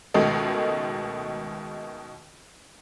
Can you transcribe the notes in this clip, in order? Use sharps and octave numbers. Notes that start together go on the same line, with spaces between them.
C#2 B2 D#3 G#3 A3